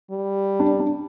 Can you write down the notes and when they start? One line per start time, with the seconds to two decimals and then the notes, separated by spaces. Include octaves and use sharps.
0.11 G3
0.60 D4
0.80 D4